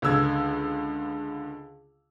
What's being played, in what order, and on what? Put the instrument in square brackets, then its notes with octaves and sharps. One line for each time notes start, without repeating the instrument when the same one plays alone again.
[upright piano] C#2 D3 E6 G#6